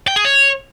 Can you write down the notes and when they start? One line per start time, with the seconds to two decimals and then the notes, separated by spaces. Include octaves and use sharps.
0.08 G5
0.16 G#4
0.25 C#5